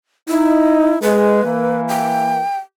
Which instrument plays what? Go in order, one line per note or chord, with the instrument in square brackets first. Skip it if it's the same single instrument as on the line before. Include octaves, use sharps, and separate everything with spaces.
[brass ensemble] D#4 [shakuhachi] E4
[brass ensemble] G#3 [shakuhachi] B4
[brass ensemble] E3 A#3
[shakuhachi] G5